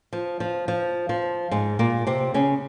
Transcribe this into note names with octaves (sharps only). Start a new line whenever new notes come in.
F3
F3
F3
F3
G#2 G#3
A#2 A#3
C3 C4
C#3 C#4